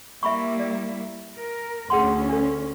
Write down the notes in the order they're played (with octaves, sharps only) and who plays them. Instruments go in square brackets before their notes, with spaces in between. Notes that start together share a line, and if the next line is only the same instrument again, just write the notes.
[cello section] G3 A#3 E4 [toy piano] E5 B5 C#6
[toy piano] D5
[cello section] A#4
[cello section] D2 C#4 [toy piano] G#4 F#5 C6
[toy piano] D4 A4